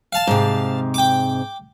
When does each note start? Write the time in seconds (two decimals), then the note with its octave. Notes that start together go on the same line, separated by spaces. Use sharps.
0.13 F5 A5
0.27 G#2 C3
0.94 G5 D6